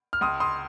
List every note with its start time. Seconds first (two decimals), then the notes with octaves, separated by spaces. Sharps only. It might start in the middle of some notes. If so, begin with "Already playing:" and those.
0.13 F6
0.21 C#2 C6 D#6
0.40 C6 D#6